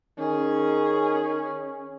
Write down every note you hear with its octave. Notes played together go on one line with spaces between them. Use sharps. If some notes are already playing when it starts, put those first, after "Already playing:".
D#3 C#4 G#4